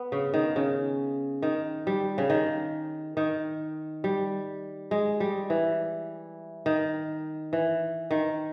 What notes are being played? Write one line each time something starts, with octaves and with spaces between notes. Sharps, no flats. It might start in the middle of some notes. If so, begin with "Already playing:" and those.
Already playing: B3
C#3
D#3
C#3
D#3
G3
C#3
D#3
D#3
G3
G#3
G3
E3
D#3
E3
D#3